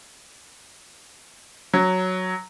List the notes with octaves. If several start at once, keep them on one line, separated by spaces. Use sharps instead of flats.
F#3